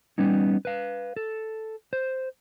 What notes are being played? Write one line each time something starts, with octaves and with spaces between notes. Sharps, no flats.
G3 B3 C#4 D#4
B4 F5
A4
C5